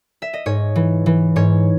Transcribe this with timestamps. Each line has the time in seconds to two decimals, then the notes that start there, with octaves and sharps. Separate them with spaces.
0.22 E5
0.33 D#5
0.46 G#2 C#5
0.76 E3
1.06 E3
1.36 G#2 C#5